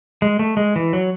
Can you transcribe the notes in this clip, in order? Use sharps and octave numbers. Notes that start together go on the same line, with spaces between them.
G#3
A3
G#3
E3
F#3